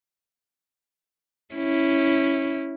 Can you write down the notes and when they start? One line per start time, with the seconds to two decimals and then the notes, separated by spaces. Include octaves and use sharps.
1.55 C#4 E4